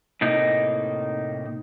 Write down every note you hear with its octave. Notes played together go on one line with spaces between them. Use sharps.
A2 C3 A#3 D#4